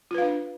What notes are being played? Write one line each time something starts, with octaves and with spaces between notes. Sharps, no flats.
D4 F4 B4 F5